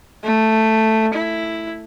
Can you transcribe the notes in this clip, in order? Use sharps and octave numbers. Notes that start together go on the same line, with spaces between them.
A3
E4